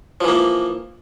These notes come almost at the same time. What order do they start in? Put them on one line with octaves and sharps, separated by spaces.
F3 E3 A#3